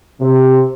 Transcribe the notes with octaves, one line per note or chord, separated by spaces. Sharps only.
C3